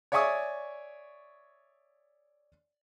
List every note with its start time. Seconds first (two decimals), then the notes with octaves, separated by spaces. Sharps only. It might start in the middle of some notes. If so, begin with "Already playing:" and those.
0.12 C#5 D5 E5 G#5 C#6 D#6